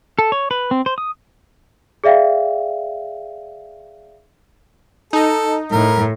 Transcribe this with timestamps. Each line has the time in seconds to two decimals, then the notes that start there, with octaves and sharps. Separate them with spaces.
0.19 A4
0.32 C#5
0.51 B4
0.71 C4
0.86 C5
0.98 D#6
2.04 G#4 D5 E5 F5 G5
5.13 D#4 A4
5.71 A2 A#4